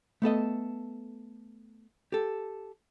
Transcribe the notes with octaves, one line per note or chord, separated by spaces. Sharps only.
A3 B3 A4 D#5
G4 A4